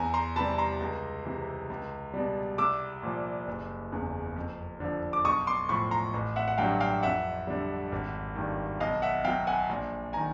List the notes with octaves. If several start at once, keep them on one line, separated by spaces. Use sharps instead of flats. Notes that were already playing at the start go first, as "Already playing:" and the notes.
Already playing: E2 G#5 A#5
A#5 C6
C3 E3 G3 A5 B5
A#5 C6
C#2
C3 E3
C#2
B2 G3
C2 D6 E6
A#2 F3
F#1
E2 C#3
F2
D3 F3
D6
B1 C#6 D#6
C6 D6
A2 F3 B5 C#6
A#5 C6
A1
E5 F#5
F#5
G2 D3 F#3 F5 G5
F5 G5
F2 E5 F#5
D3 G3
G#1
G2 D#3
B1 D#5 F5
E5 F#5
B2 F#3 F5 G5
F#5 G#5
A#1
D#3 G#5 A#5